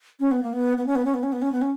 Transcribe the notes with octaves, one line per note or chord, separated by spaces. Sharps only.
C#4
B3
A#3
B3
B3
C#4
B3
C#4
B3
C#4
B3
C#4
B3
C#4